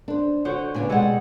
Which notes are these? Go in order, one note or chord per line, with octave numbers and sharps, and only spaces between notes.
D4 C5
D3 F#4 C5 C#5
A#2 C#3 B3 D4 G#5
B2 G3 G#3 A4 C#5 F#5